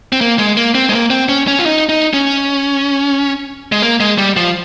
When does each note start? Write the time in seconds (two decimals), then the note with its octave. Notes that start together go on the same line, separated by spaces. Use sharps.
0.13 C4
0.21 A#3
0.39 G#3
0.57 A#3
0.75 C4
0.89 G#3
0.92 A#3
1.10 C4
1.29 C#4
1.48 C#4
1.59 F4
1.66 D#4
1.89 D#4
2.13 C#4
3.72 G#3
3.82 A#3
4.00 G#3
4.18 G3
4.36 F3